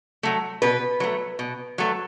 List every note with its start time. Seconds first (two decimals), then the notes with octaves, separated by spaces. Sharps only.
0.23 F#3 A3
0.62 B2 B4
1.00 F#3 A3
1.39 B2
1.78 F#3 A3